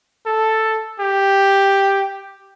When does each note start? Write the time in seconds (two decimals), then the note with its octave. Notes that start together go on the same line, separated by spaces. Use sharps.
0.27 A4
1.00 G4